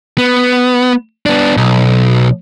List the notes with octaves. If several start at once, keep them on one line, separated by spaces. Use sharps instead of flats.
B3
B3 D4
B1